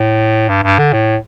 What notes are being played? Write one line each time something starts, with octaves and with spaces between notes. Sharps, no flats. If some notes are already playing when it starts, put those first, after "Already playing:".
Already playing: A2
G2
G2
D3
A2